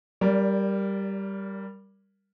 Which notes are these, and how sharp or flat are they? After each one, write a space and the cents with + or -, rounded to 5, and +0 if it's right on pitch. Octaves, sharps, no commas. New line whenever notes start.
G3 +0 A#4 +0 D5 -30